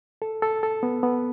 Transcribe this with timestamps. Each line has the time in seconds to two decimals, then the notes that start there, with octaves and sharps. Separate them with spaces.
0.22 A4
0.42 A4
0.63 A4
0.83 B3
1.03 B3